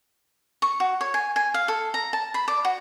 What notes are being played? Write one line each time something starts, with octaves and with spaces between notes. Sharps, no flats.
C#6
F#4
C#5
G#5
G#5
F5
A4
A#5
A5
B5
D5
F#4